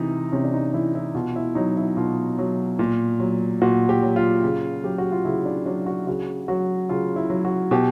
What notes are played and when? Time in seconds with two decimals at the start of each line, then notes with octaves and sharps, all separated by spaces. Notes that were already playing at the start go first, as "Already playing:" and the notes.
Already playing: C3 E3 D#4
0.32 C3 C#4
0.44 D4
0.54 D#4
0.74 E3 E4
0.95 E4
1.15 B2 F4
1.36 E4
1.55 F#3 D#4
1.77 E4
1.97 B2 F4
2.39 F#3
2.79 A#2
3.20 F#3
3.62 A#2 F#4
3.89 G4
4.02 F#3
4.16 F4
4.43 C#3
4.84 F#3 G4
4.98 F#4
5.12 F4
5.25 C#3 E4
5.45 D4
5.66 F#3 D4
5.86 F#4
6.07 C#3 F#4
6.48 F#3 F#4
6.89 C#3 F4
7.16 E4
7.30 F#3
7.45 F#4
7.71 B2 G4